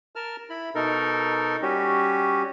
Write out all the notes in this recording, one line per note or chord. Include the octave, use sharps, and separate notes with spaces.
A#4 A5 F6
E4 B5
B2 D#4 A4 A#4
G3 C#4 F#4 G4